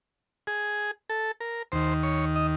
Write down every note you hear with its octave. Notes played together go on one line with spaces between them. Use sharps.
G#4
A4
A#4
D#2 D#3 C5
C#5
D#5